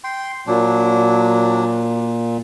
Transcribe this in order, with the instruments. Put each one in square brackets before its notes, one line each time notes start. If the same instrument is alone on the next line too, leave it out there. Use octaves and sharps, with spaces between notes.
[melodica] G5 C6
[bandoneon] A#2 [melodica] F#3 D4